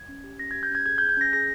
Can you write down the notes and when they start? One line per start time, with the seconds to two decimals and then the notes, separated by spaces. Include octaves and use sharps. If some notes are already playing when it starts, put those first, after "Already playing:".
Already playing: G#6
0.09 C#4
0.24 G4
0.39 C#4 A#6
0.51 G4 G#6
0.63 G6
0.71 C#4 G#6
0.86 G#4 G#6
0.98 G6
1.02 G#4
1.09 G6
1.17 C#4 A#6
1.33 G#4 A#6